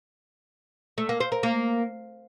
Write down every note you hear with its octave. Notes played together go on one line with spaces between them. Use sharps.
A3
A#3
C5
A#4
A#3